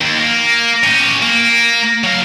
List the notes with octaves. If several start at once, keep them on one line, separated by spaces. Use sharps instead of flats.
D#2
A#3
C#4 G4
A#3
F#3 F5